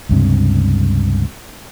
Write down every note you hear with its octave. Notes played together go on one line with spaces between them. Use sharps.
C#2 G2 C3